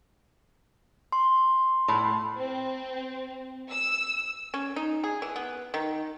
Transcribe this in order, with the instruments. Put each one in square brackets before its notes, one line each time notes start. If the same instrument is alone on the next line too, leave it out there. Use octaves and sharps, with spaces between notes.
[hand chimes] C6
[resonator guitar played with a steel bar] A2
[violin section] C4
E6
[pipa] C#4
D#4
G#4
E3
B3
D#3